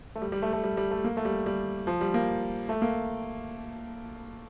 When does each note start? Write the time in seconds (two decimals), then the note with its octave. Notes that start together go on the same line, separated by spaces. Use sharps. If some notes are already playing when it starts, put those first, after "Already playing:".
0.15 A3
0.22 G3
0.32 G3
0.42 A3
0.53 A3
0.64 G3
0.77 G3
0.91 A3
1.04 A#3
1.17 A3
1.25 G3
1.46 G3
1.87 F3
2.01 G3
2.14 A#3
2.69 A3
2.82 A#3